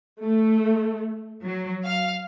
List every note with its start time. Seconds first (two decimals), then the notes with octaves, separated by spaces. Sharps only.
0.22 A3
1.44 F#3
1.85 F5